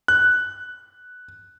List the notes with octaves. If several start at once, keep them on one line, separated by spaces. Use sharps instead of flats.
F#6